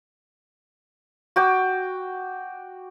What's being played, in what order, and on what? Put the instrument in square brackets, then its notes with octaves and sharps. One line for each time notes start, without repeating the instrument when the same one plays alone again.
[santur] F#4 G5 D6